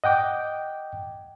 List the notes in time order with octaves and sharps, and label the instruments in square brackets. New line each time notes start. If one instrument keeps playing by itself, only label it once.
[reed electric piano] D#5 F#5 G5 D6